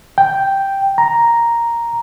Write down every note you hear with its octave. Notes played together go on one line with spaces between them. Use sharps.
G5
A#5